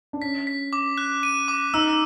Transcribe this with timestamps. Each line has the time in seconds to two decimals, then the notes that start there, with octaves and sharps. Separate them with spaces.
0.13 D4
0.22 C#4 B6
0.47 B6
0.73 D6
0.98 F#6
1.23 D#7
1.48 D6
1.74 D#4 E6